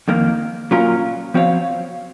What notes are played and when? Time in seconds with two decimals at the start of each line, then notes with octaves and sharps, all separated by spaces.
0.08 F2 D#3 A#3
0.71 A#2 F#3 C#4 F4 A#4
1.34 F3 C4 F#4 C#5 F5